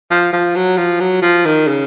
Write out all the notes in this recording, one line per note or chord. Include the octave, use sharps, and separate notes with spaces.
F3
F3
F#3
F3
F#3
F3
D#3
C#3